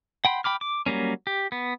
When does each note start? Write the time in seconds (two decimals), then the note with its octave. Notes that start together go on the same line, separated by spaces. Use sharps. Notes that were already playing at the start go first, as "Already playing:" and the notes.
0.25 F#5 G5 B5 C6
0.44 G5 B5 D6 F6
0.61 D6
0.86 F#3 G3 A#3 C#4
1.27 G4
1.52 B3